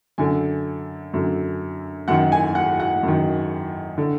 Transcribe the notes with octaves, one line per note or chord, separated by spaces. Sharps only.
F#2 D3 G#5
F#2 D3
F#2 D#3 F#5
G#5
F#5
F#5
F#2 D#3
D3